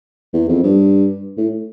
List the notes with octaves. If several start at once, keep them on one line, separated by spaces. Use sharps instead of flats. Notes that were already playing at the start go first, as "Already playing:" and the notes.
E2
F2
G2
A2